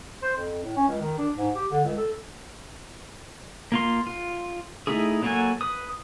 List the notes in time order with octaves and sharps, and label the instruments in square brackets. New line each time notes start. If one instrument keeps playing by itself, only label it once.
[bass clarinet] C5
F2
A2
C#4
C#2
D#3
D4
G#2
G4
D3
C#2
A4
[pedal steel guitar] A#3 F4 C6
F4
A3 D#4 E4 G#4
F#3 A#3 F#4 A4 G#5
B4 D#6